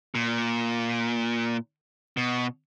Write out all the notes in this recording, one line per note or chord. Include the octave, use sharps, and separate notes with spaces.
A#2
B2